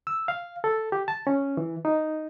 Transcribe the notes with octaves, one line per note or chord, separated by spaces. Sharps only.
E6
F5
A4
G4
A5
C#4
E3
D#4